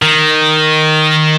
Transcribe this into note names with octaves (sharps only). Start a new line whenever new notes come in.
D#3